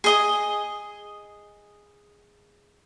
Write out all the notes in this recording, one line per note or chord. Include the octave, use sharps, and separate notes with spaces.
G#4 D#5 D#6